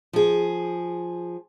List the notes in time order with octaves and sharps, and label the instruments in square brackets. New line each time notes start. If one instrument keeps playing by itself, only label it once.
[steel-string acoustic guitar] F3 G#4